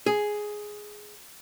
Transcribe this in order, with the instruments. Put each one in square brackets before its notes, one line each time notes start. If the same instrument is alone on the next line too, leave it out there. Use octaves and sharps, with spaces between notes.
[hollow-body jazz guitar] G#4